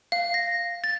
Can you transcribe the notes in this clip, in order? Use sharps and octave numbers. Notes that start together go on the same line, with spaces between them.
F5
A#6
A6